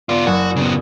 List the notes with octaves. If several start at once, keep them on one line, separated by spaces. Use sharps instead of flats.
B3 F4 D5
F#1 F#4 E7
C#3 B3